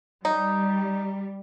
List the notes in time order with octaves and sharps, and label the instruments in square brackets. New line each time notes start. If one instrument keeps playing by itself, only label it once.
[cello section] G3 [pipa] D#4